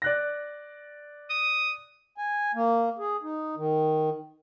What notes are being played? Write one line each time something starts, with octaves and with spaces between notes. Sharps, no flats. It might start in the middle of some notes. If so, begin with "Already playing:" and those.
D5 F#6 A#6
D#6
G#5
A#3
G#4
D#4
D#3